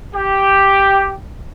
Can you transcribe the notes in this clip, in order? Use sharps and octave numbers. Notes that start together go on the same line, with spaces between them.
G4